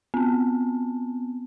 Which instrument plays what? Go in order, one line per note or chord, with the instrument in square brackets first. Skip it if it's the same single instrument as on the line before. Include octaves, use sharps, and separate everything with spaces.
[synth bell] B3 C4